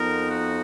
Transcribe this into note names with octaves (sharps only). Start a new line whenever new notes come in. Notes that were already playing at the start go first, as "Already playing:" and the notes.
Already playing: F2 F3 B3 D#4 A#4
F#4